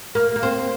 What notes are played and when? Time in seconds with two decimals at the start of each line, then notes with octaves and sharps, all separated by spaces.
0.15 A#3
0.36 A#3
0.43 C4